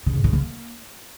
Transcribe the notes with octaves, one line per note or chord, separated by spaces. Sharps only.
C#3
G#2
C#3
A#3